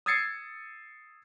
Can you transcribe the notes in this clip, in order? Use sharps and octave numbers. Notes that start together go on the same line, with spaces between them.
D#6 E6 G#6 A6 C7 C#7